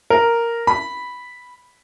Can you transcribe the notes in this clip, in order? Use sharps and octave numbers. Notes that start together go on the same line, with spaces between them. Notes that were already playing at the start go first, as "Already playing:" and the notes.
A#4
B5